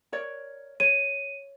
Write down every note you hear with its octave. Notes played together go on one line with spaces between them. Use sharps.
A#4 C#5 D5
C#5 D#7